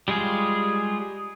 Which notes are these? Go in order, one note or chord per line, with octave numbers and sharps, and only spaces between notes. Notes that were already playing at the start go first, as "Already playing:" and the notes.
G3 G#3 F4 G#4